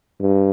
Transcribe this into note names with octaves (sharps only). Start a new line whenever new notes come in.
G2